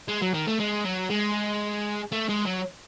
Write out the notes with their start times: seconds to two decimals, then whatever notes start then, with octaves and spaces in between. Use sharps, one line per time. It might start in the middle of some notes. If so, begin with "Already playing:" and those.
0.08 G#3
0.22 F#3
0.34 D#3
0.47 A3
0.60 G#3
0.84 F#3
1.10 G#3
2.12 A3
2.28 G#3
2.45 F#3